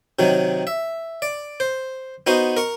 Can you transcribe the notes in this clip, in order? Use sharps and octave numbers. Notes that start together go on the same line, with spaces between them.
C3 D#3 F#3
E5
D5
C5
B3 D#4 F#4 C5
A#4 C#6